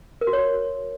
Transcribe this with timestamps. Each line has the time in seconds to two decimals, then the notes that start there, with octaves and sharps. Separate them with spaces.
0.21 A#4
0.27 F#4
0.33 C#5